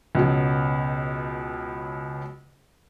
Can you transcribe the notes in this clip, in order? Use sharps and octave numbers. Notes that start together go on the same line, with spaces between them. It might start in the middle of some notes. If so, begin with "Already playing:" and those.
C#2 B2 F#3